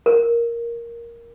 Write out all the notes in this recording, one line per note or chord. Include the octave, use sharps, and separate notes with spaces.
A#4